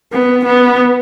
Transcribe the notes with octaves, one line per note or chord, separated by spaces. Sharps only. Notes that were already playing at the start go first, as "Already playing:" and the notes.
B3
B3